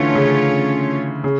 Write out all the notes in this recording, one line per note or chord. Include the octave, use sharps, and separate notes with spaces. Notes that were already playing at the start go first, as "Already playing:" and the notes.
Already playing: D3 E3 A3 C#4 F4 C#5
C#3
C#3